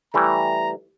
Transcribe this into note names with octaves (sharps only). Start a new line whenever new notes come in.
E3 G3 A3 A#5